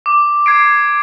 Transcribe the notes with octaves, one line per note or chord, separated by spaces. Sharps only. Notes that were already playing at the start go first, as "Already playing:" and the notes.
D6
G#6 C7 D7